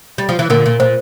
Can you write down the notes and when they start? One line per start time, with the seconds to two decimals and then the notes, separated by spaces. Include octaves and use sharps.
0.18 G3
0.29 F3
0.39 E3
0.50 A#2 D3 A#4
0.66 A#2
0.80 A#2 C5